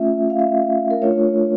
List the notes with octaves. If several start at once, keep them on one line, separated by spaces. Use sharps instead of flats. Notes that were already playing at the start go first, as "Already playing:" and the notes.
Already playing: A3 C#4 F4 E5
F5
E5
A#4
A3 D4 F4 C#5